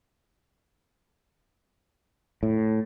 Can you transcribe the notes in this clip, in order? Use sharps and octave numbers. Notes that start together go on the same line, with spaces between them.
A2